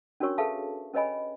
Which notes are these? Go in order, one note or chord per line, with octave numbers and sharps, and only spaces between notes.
C#4 D4 F#4 A#4 C#5 C#6
G#4 A4 B4 E5 F5 A5
C#4 B4 C#5 D#5 G#5 B5